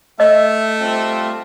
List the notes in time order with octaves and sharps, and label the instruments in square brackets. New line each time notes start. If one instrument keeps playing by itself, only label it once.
[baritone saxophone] A3 [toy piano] D#5 [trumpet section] E5
[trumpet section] G3 C4 F4